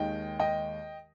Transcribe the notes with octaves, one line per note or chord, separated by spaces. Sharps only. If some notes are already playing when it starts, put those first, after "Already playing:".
Already playing: D#2 D#3 G#3 D#5 G5
D#5 G5